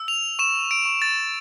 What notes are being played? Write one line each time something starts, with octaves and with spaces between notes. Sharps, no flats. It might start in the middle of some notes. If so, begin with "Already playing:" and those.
Already playing: E6
F7
C#6 E7
D7
C#6
A6